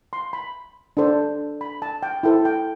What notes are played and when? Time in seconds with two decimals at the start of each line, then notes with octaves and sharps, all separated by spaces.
0.13 C6
0.33 B5
0.97 D4 A4 C5
1.61 B5
1.82 A5
2.03 G5
2.23 E4 A4 C5 G5
2.45 G5